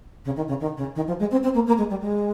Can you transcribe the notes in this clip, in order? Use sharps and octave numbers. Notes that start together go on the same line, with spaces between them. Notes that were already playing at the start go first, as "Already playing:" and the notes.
C#3
D#3
C#3
D#3
C#3
D#3
F3
G#3
C4
C4
A#3
A#3
G#3
G3
G#3